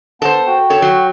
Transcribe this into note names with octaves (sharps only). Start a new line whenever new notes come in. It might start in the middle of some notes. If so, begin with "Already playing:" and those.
B3 A4 C5 A5
F#4 F#5 G5
A4 C#5
F#3